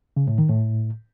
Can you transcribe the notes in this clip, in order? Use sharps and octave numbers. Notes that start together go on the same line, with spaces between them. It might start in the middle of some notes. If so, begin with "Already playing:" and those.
C#3
A2
D#3
A2